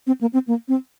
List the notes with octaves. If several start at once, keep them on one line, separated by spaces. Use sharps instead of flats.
C4
A#3
C4
A#3
C4